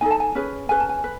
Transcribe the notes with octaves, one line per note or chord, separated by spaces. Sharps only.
D#4 A4 G#5
A5
G#5
C#4 G#4 B4
C#4 G#4 B4 G#5
A5
G#5
B4